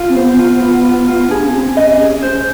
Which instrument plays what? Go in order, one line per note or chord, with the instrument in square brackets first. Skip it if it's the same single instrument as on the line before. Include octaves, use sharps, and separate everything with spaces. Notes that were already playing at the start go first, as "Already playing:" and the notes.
Already playing: [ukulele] F4
[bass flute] C4
[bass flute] B3 [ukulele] C5
[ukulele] F4
F4
F4
F4
[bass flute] D4 [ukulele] G#4
[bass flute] C#4
[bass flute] C4 [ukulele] G#4
[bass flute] C#4 [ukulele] D#5
[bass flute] C#4 [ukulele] G#4
[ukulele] C5